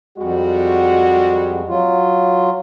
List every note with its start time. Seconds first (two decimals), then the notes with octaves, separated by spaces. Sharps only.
0.18 F2 G3 G#3 F#4
1.69 F#3 F4